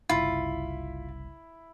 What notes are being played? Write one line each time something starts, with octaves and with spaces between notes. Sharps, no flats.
F#1 C2 E4 F4 B5